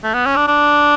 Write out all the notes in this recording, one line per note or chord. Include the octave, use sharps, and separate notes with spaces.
A3
B3
C#4
D4
D4